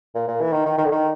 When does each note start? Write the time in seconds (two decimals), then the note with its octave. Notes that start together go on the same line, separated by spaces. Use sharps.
0.15 A#2
0.28 A#2
0.40 E3
0.52 D#3
0.65 D#3
0.78 D#3
0.85 D3
0.91 D#3